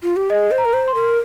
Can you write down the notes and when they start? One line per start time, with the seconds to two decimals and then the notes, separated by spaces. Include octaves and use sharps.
0.03 F4
0.16 G4
0.30 G#4 D#5
0.51 C5
0.58 A#5
0.65 A#4
0.73 C5
0.88 C6
0.95 A#4